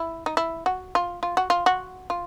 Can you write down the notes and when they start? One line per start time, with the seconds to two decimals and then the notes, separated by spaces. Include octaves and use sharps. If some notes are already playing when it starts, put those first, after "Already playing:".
Already playing: E4
0.26 D#4
0.37 E4
0.66 F#4
0.95 F4
1.23 F4
1.37 F#4
1.50 F4
1.66 F#4
2.10 F4